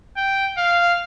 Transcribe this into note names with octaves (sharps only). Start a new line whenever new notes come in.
G5
F5